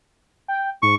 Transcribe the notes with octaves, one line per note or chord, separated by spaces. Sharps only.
G5
G#2 C#6